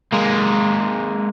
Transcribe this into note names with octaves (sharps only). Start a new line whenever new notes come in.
G#3 A#3